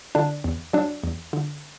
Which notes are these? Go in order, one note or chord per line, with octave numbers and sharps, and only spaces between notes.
D3 D4
E2
F#3 D4
E2
D3